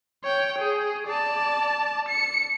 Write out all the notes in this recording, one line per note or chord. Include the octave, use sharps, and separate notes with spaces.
C#5 G5
G#4
D5 A5
C#7